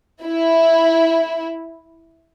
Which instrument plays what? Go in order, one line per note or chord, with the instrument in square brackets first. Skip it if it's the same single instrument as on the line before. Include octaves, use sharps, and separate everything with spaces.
[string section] E4